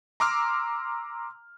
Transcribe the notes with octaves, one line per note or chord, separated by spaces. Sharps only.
A#5 C6 D6 E6 F6